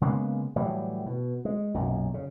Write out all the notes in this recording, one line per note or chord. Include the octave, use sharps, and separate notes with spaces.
C#3 G#3 A#3 B3
A2 E3 F#3 G3
B2
G#3
B1 F#2 A#2
C#3